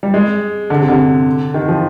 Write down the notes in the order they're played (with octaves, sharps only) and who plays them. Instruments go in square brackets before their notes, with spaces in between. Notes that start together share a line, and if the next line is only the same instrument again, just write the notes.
[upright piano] G3
G#3
D3
C3
D3
D#3
F3